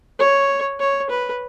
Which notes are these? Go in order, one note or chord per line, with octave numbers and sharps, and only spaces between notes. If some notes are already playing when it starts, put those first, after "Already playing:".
C#5
C#5
B4